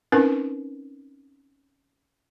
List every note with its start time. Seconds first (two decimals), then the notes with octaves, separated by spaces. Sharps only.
0.12 C4 C#4 D#4 E4 A#4 B4